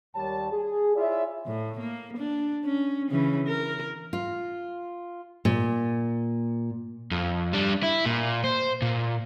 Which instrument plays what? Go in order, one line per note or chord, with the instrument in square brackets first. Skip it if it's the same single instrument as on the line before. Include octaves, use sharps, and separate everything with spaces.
[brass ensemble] D#2 G3 C#5 A5
G#4
E4 F4 G#4 C#5 D5 E5
[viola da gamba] A2
A#3
D4
C#4
C#3 E3 C#4
A#4
[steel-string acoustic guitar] F4
A#2
[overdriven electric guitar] F2
G3 D4
E4
A#2
C5
A#2